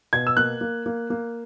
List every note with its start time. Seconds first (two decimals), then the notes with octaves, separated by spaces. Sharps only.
0.13 B2 G#6
0.27 E6
0.37 A#3 F#6
0.61 A#3
0.86 A#3
1.10 A#3